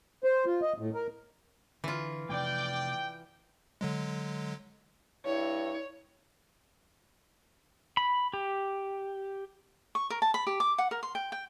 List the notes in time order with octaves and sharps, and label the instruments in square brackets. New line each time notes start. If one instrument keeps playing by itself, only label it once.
[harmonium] C5
F4
D#5
A2
A#4
[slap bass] D3 [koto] E3 F4
[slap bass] C3 F3 A3 [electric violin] D5 D6 [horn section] G5
[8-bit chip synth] D3 F#3 G#3
[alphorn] G2 [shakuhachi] E4 [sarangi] C#5
[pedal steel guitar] B5
G4
[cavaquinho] C#6
A#4
A5
B5
G4
D6
F#5
A#4
C6
G5
G5